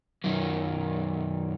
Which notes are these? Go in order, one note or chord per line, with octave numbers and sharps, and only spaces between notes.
F#2 D#3 F#3